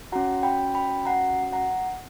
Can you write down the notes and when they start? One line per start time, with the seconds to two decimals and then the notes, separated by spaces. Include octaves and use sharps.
0.12 C#4 F#4 F#5 A#5
0.43 G5 B5
0.75 G5 B5
1.05 F#5 A#5
1.52 F#5 A#5